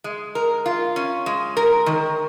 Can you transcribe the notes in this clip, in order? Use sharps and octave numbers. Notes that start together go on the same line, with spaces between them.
G#3
A#4
F4
C#4
G#3
A#4
D#3